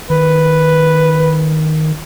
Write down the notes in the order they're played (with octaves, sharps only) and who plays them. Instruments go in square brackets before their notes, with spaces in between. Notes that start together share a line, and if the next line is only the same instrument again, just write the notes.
[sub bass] D#3 [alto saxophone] B4